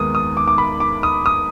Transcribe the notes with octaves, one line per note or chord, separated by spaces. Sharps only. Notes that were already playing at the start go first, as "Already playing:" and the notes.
Already playing: D#2 D#3 G#3 B3 D#6
D#6
D6
D6
B5
D6
D#6
D#6